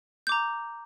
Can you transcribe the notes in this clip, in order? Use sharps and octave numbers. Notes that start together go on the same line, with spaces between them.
A#5 D6 G6